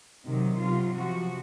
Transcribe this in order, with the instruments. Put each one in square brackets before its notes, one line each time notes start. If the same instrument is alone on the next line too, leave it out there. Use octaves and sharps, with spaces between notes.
[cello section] C3 D#3 F#3
C3 F#3 F4
C3 F3 F#4